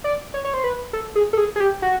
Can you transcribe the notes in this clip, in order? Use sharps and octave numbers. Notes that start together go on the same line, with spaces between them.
D5
C#5
C#5
C5
B4
A4
G#4
A4
G#4
G#4
G4
F#4